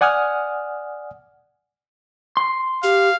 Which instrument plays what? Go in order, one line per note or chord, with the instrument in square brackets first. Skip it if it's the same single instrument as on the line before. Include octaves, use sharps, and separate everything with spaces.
[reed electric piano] D5 F#5 G#5 D#6 F6
[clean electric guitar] C6
[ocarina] G4 [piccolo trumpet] F5